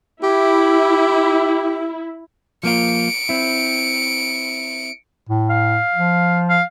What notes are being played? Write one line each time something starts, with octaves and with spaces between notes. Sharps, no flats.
E4 G4
F3 A#3 F4 C#7 D7
C4 E4
A2
F5
F3
F5